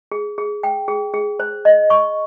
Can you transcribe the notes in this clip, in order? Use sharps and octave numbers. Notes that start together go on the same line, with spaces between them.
G#4
G#4
G5
G#4
G#4
C5
D#5
C#6